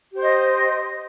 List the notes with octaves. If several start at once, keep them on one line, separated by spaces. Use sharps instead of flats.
G4 C5 D#5